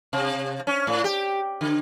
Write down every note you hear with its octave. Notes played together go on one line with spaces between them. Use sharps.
C3
C#4
A2
G4
D3